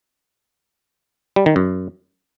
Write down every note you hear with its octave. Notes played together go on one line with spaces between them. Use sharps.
G3
D#3
F#2